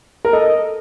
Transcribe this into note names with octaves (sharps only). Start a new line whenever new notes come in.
A#4
A4 D#5